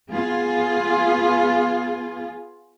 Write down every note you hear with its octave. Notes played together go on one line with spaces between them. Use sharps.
B3 F4 G#4